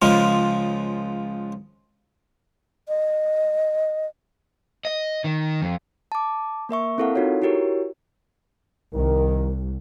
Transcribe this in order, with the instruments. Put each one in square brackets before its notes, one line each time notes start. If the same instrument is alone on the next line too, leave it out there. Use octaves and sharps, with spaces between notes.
[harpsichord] C#2 F3 G#3 F4
[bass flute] D#5
[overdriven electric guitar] D#5
D#3
F2
[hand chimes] A5 D6
A#3 A#4 E5 C#6
C4 E4 A4 A#4 F5 F#5
D#4 F4 F#4 A4 C#5
E4 F#4 G4 A#4 C#5
[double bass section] C2 [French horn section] D#3 A#4